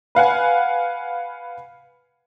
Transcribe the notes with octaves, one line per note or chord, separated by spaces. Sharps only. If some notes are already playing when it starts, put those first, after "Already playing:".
B4 F5 F#5 G#5